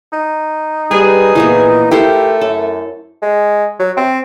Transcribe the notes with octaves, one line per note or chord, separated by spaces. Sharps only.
D#4
G3 G#4 B4
A#2 E3 F3 B3
A3 E4 F4 G4 A#4 C5
F#2 A4
G#3
F#3
C4